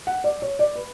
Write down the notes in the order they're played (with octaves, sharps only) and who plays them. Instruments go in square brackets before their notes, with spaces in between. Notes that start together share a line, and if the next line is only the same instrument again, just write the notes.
[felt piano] F#5
D5
C#5
D5
B4